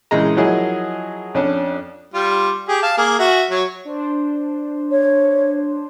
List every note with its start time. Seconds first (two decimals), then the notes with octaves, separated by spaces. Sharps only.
0.11 A#1 C#3 E3 G#3 D#5 A#5
0.37 F3 F#3 E4 G#4 A#4 D#5
1.34 F2 C#4 D4
2.14 G3 F4
2.68 G4 G#4
2.82 F5 A5
2.97 A#3 G#4
3.19 F#4 E5
3.50 F#3 C#5
3.85 D4 C5
4.91 C#5